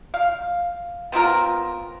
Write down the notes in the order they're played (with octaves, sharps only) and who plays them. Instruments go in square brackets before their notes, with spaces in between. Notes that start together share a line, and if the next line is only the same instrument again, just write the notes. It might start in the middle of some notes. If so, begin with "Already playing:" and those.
[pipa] F5
B3 C4 F4 A#4